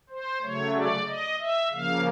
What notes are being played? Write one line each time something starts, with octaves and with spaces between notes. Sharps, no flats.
C5
C#3 F#3 A3 C#5
D5
D#5
E5
C#3 F3 A#3 F5